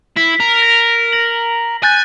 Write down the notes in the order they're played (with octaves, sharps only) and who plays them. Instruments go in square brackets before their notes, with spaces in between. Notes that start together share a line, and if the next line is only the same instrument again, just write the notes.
[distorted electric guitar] E4 [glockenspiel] B6
[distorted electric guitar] A#4
[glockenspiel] A#6
A#6 F#7
[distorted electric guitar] G#5 [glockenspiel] F#6 G6 A6